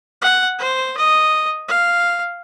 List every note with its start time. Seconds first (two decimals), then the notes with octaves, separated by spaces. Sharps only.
0.22 F#5
0.59 C5
0.97 D#5
1.68 F5